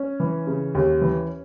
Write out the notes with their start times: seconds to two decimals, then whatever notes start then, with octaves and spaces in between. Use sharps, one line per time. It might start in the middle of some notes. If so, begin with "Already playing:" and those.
Already playing: C#4
0.20 E3
0.47 C#3
0.75 D#2
1.02 E3